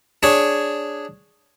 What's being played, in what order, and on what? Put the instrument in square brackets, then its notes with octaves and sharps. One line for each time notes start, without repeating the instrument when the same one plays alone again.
[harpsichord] D4 G#4 C#5